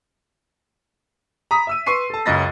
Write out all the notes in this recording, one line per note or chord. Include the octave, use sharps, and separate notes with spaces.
A#5 B5 D#6 B6
E5 E6 D#7
B4 C6 C#6 C7 D#7
A4 A5
C#2 F#2 D#5 B5 A6 A#6